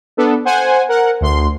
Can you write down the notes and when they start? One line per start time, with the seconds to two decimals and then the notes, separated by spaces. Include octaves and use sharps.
0.17 B3 D4 A4
0.45 C5 F#5 G#5
0.88 A#4 F#5
1.21 D2 C6